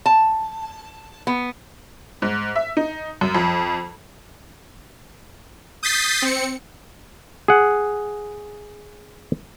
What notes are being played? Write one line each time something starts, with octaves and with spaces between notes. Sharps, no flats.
A5
B3
G#2
E5
D#4
F#2
F2
D#6 G6 A6 B6 C7
C4 C#7
G#4 F#5